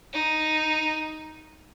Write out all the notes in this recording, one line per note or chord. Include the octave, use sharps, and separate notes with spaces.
D#4